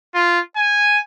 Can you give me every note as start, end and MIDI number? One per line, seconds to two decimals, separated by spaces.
0.14 0.40 65
0.56 0.99 80